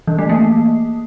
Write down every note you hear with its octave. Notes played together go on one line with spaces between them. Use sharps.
E3
A3
A#3